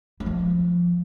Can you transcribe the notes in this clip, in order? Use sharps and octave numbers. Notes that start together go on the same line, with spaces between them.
E3
F3